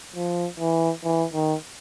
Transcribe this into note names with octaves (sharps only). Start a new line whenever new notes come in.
F3
E3
E3
D#3